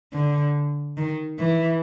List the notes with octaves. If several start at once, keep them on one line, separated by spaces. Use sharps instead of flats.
D3
D#3
E3